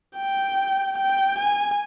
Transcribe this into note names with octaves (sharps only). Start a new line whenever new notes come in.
G5
G5
G#5